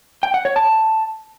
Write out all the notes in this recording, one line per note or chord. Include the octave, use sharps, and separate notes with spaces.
G5
F#5
C#5
A5